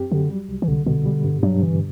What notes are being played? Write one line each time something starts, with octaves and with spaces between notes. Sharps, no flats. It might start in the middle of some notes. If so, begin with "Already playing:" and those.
Already playing: F#2 C4 G4
D3 F#3
G3
C2
E3
C2 D3
B2 D3
G3
G2
G2 F#3
D3 E3